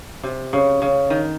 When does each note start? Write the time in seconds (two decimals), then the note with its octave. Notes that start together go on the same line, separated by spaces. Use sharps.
0.23 C3
0.53 C#3
0.82 C#3
1.10 D#3